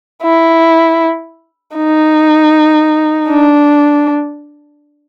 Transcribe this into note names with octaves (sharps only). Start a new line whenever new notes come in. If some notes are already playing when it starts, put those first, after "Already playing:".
E4
D#4
D4